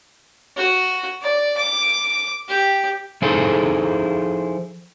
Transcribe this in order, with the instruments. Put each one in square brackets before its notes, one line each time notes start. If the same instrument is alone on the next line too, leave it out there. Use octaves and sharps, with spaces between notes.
[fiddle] F#4
D5
D6
G4
[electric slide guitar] F3 D#4 E4 G#4 A4 C5